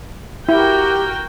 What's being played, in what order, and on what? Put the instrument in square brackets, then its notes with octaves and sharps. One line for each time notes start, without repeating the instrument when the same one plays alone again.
[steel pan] E4 [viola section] F#4 A#4 G5 [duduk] G4